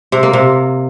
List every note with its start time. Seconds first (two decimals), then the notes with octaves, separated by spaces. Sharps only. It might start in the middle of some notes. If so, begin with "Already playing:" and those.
0.12 C3
0.23 A#3
0.33 C3